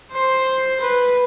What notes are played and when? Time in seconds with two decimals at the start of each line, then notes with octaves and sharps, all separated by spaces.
0.12 C5
0.81 B4